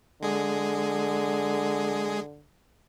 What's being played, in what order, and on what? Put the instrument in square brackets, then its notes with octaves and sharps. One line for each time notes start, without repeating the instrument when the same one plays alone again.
[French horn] D3 [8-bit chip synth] G#3 G#4